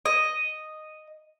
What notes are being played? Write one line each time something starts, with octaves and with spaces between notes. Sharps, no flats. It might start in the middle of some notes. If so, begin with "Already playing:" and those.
D#5